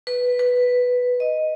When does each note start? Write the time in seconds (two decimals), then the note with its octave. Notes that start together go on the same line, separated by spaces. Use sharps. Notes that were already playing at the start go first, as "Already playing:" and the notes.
0.07 B4
0.39 B4
1.20 D#5